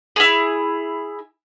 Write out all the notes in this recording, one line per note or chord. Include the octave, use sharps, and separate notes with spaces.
E4 G#4